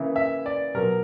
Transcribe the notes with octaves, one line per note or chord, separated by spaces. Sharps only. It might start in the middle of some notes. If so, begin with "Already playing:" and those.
Already playing: C#3 E3 A#3 E4
E5
D5
B2 F#3 B3 A#4